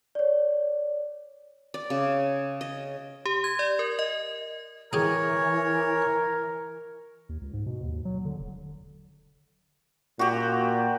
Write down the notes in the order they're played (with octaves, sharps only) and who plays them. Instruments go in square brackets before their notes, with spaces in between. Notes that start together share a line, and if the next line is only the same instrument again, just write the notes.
[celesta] C#5 D5
[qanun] D5
C#3
D#5
[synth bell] G4
G#6
D5
A#4
D#5
[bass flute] E3 [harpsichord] G4 G#4 [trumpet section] A#4 [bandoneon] C#5
[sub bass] D#2
C#2
G#2
B2
D#2
F#3
D3
E1
[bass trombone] A#2 [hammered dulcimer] F#4 G4